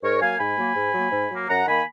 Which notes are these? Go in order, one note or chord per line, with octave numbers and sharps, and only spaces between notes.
G#2 A#4 C#5
F#3 A#3 F5 G#5
G#2 G#5 B5
F#3 A#3
G#2
F#3 A#3
G#2
F#3 A#3
F#2 F#5 A#5
D#3 A#3 G#5 B5